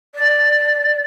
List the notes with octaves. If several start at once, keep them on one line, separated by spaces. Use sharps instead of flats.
D5